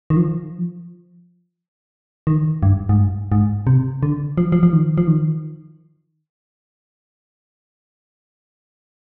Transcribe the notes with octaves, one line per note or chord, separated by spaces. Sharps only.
D#3
F3
D#3
G2
G#2
G2
G#2
C3
D3
F3
F3
F3
D#3
F3
D#3